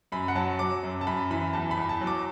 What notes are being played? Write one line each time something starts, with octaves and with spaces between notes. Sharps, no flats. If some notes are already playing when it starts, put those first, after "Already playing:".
F#2 B5
F#5
F#3 A5
F#3 D6
F#2
A5
F#2 B5
E3 B5
E2 A5
B5
E2
A5
F#3
D6